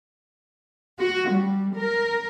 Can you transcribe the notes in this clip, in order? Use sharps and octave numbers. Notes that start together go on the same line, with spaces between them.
F#4
G3
A#4